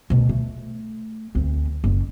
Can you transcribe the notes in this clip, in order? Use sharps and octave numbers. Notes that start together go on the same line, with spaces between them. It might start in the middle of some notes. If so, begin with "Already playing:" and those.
D2 B2
A3
D2 C4
F#1